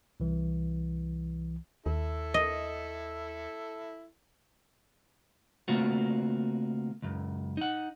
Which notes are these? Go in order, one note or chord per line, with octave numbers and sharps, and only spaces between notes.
C2 E3
D#2 E4 A4
D#5
C#3 A3 A#3 C4 F4 F#4
C#2 F#2
D#4 F#5